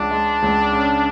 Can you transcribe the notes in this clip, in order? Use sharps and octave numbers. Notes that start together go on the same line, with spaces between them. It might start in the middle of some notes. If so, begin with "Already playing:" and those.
Already playing: C#2 C#3 D4
G#3
C#2
C#3